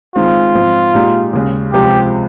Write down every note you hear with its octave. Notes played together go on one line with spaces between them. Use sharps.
D#3 G#3 C4 F4
G#2 F3 C4
A#2 G#3 D#4 G4
D#2 C#3 G#3
C#2 C3 F3 G#3 G4